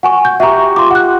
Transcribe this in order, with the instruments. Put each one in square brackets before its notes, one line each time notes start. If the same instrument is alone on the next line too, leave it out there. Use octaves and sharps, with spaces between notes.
[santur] F#4 [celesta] F#5 G#5 C#6
[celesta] G6
[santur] F#4 G4 [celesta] E5 A#5
[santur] F4 [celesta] C6 D6
[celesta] F#5 F#6